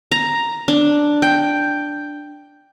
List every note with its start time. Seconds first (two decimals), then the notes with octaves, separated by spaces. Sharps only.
0.12 A#5
0.68 D4
1.22 G5